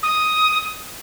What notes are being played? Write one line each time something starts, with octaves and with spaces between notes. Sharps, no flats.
D#6